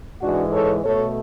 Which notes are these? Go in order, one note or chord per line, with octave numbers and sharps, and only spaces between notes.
G#2 E3 G#3 D4 F#4
A4 C#5
B2 A3 A4 C#5